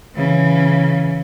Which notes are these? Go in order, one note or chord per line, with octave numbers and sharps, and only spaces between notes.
C#3 E3